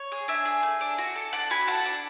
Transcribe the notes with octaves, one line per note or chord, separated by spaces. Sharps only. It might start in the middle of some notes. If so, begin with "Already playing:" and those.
Already playing: C#5
G#4
D4 E5 G#5
G#4
A3
D4
F#4
A4
D4 F#5 A5
F#4 G#5 B5
A4 F#5 A5
D4